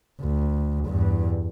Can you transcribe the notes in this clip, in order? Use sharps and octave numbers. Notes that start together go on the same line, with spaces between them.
D2
E2 G2